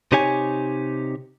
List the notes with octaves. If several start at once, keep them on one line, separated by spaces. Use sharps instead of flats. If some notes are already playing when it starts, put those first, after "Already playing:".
C3 D#4 G4 C#5 G#5